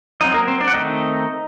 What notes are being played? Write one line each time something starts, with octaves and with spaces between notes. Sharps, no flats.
F#3 C4 D#4 D#5
A#3 A#4
C4 C5
D4 D5
F#5
D#3 A3 C4 D#4 D#5